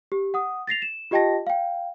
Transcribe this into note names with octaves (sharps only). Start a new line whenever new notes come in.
G4
F#5 D#6
A6 A#6 C7 F7
E7
F4 G4 D#5 G5 A5 A#6
F5 G5